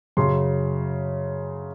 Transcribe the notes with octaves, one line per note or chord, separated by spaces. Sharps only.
F#2 C#3 F#3 C6